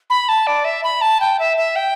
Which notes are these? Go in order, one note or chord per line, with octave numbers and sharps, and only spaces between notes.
B5
A5
D5
E5
B5
A5
G5
E5
E5
G5